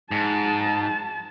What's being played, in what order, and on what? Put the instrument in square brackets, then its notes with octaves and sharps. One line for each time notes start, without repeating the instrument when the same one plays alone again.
[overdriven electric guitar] G#2 [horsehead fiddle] A5